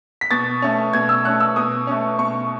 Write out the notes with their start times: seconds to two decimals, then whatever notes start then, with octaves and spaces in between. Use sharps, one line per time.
0.21 B6
0.31 B2 A6
0.62 A3 C#4
0.93 B2 G#6
1.09 E6
1.25 A3 C#4 F#6
1.40 E6
1.56 B2 D#6
1.87 A3 C#4
2.18 B2 C#6